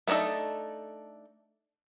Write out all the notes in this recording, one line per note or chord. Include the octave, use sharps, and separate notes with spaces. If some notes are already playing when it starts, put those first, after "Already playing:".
A3 B3 D4 D#4 A4